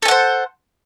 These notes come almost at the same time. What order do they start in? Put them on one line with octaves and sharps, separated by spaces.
A4 G#5 F#5 C5